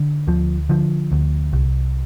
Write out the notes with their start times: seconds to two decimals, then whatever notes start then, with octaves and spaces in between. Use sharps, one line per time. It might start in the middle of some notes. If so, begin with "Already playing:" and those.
Already playing: D3
0.27 D2 F3
0.69 D3 F3
1.12 D2
1.53 C2